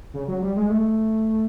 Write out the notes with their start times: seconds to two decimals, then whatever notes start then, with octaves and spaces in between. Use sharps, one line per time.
0.14 C#3
0.28 F#3
0.42 G3
0.56 G#3
0.69 A3